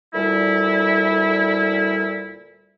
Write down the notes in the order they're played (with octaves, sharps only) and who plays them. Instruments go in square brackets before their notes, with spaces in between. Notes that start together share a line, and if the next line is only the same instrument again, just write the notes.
[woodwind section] D2 A#2 G3 E4